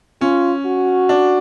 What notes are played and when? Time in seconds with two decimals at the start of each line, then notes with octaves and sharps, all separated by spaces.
0.21 C#4 F4
0.66 F#4
1.09 D4